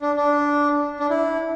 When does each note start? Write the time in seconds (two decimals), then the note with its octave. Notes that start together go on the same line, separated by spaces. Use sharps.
0.01 D4
0.16 D4
1.00 D4
1.10 E4